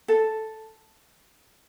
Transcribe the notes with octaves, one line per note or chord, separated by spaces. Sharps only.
A4